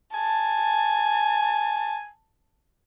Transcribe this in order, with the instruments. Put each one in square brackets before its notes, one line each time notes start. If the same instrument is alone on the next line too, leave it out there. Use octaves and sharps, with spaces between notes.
[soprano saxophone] G#5 [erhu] A5